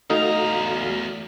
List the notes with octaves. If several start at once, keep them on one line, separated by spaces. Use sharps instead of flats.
E2 A3 D#4 F#4 F5 A#5